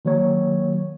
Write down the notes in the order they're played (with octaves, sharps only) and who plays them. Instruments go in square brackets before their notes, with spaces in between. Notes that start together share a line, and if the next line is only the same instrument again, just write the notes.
[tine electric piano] D#3 F#3 A#3 C#5